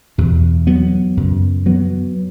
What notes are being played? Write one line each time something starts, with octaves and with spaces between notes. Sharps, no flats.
E2 B2
F#3 B3
F#2 C#3
F#3 B3